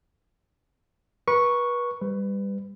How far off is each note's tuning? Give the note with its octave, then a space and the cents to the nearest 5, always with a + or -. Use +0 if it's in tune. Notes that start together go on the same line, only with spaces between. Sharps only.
B4 -35 C#6 +0
G3 +15 B4 +20